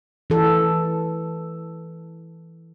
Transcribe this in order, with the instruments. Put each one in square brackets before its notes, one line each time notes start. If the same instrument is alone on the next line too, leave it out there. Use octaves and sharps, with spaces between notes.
[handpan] E3 A4